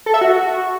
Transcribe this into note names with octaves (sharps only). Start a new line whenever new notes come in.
A4
E5
F#4